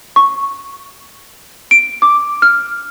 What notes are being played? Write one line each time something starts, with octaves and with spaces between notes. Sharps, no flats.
C#6
D7
D6
F6